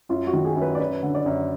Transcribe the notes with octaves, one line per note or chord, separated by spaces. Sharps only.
F#2 F4
F#4
D#3
G#4
F#2
B4
D5
F#2 B4
D3
D5
F#2